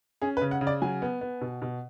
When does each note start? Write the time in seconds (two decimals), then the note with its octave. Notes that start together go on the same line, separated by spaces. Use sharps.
0.22 C#4 G#4
0.37 B4
0.41 C#3
0.51 F#5
0.61 C#3
0.67 D5
0.82 F#3 G#5
1.02 B3
1.21 B3
1.41 B2
1.62 B2